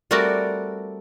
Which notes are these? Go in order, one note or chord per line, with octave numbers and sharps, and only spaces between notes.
G3 A3 C4 F#4 A#4 D5